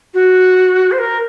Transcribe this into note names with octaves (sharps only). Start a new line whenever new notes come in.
F#4
C5
A#4